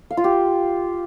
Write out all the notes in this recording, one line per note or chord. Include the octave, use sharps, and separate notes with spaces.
F5
F4
G4